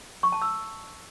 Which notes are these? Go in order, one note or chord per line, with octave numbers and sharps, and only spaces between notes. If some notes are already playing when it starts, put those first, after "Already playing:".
C#6
A5
E6